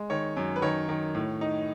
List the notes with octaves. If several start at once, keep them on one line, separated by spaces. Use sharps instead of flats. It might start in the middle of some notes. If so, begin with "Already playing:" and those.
Already playing: G#3
D#3 C#5
F#2
B4
D#3 C#5
D#3
A2
D#4